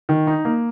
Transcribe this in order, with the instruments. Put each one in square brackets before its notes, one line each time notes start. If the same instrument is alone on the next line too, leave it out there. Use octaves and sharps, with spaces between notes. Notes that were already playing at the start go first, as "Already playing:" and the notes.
[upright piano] D#3
D#4
A#3